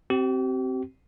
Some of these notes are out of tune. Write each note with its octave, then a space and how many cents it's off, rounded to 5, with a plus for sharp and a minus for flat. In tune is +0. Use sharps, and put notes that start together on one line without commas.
C4 +0 G4 -40